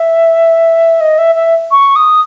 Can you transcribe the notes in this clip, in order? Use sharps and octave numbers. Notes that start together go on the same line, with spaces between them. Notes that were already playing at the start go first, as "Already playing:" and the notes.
Already playing: E5
D#5
E5
E5
C#6
D#6